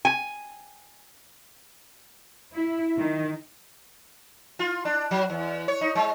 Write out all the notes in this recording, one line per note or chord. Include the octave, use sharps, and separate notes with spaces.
G#5
E4
D#3
F4
D4
F#3
E2
C#5
D#4
G#3